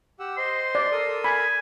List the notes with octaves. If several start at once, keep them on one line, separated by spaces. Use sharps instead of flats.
G4 F#5 E6
C5 D#5 C6
D5
A4 A#4 D#6
G#5 B5